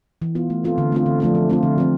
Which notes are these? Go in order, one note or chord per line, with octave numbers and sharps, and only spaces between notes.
E3
B3 F4
A3
C4 F4 A4
D3
A3 C4 F4
D3
F3 A3 D4 F4
F3
A3 C4 F4
D3
F3 A3 C4